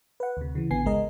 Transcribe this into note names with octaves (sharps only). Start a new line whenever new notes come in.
B4 F#5
D2 C3
C#3 E3
A1 D3 B3 G#5 C7
G#1 C#2 G#3 A#4 D#5